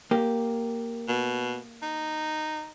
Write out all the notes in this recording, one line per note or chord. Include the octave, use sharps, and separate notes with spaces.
A#3 G4
B2
D#4